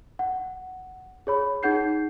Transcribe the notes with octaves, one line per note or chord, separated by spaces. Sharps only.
F#5
G#4 C#5 B5
D#4 G#4 F#5 G6 C7